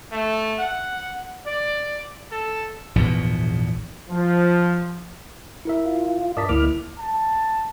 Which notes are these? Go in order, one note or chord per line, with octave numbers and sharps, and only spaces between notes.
A3
F#5
D5
A4
A#1 E2 G#2 B2
F3
E4 A#4 E5
F4
G2 A#4 D5 D#5 A5 B6
D2 A#3 E4 D6 F6
A5